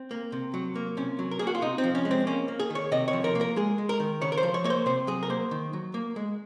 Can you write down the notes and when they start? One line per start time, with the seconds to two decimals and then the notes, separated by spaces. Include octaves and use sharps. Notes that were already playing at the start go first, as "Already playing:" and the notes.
Already playing: C4
0.11 A#3
0.32 C3
0.54 F#3
0.75 A#3
0.97 C3 C#4
1.19 F#3
1.31 A#4
1.39 A#3 G#4
1.47 F#4
1.55 F4
1.62 C3 D#4
1.78 C4
1.84 F3
1.95 C#4
2.05 G#3
2.11 C4
2.27 A#3 C#4
2.48 A#3
2.59 G#4
2.70 D#3
2.75 C#5
2.92 C3 D#5
3.08 C#5
3.13 F3
3.24 A#4
3.35 A#3
3.41 A#4
3.56 G#3 G#4
3.78 G#3
3.89 A#4
4.00 D#3
4.21 C#3 C#5
4.32 A#4
4.37 C5
4.43 F3
4.54 C#5
4.64 A#3 C#5
4.70 C5
4.86 C3 C5
5.07 F#3 G#4
5.23 A#4
5.30 A#3 C5
5.51 D#3
5.73 F#3
5.94 A#3
6.16 G#3